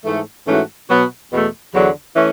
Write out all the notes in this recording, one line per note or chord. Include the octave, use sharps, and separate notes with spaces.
G#2 E3 A3
G#2 E3 A3 C#4 F#4
B2 F#3 B3 F#4
E2 B2 A3
E2 D3 F#3
E3 A3 C#4